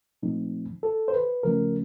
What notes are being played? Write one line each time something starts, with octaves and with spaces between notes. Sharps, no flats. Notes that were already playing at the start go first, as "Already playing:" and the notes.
A#2 F3 A3 C4 D#4
A4
C5
B4
D#2 C#3 F3 A3 C#4 A#4